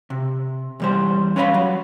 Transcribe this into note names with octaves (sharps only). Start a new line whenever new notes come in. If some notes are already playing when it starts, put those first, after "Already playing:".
C3
E2 G3 C5
C#4 B4 C#5 F5 G#5 B5
F#3